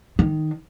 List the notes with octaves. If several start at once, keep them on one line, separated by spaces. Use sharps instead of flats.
D#3